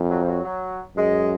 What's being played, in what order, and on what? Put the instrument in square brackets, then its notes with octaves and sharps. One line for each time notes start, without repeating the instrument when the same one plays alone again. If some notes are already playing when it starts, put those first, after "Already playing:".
Already playing: [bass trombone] F2
[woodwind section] F#3
F3
F#3
F#3
[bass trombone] F#2 [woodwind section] G#3